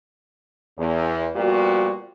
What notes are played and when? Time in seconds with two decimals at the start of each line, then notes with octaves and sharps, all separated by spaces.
0.77 E2
1.35 A#2 F3 G3 B3 F#4